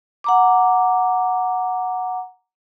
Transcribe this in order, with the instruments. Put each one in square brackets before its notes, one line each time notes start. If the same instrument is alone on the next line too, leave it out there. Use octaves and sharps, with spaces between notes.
[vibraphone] F#5 A#5 D6